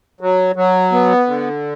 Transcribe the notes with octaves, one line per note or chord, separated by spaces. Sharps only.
F#3
F#3
B3
D3